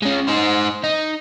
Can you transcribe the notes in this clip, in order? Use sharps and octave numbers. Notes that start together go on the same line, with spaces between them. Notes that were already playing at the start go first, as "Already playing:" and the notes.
G#3 C#4
D#4 C5
D#4